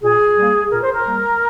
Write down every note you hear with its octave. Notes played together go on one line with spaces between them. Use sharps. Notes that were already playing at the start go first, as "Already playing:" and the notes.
A#2 G#4
G3 A#3
A#2 A#4
C5
A#4
G3 A#3